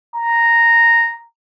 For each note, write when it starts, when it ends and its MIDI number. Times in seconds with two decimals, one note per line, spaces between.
0.16 1.22 82